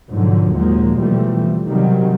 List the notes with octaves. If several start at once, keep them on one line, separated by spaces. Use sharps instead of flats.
G#2 B2 D3 F3 F#3
D#2 A#2 F3 F#3 G#3 A#3
B2 D3 E3 F3 G3 A3
C3 D#3 F#3 G3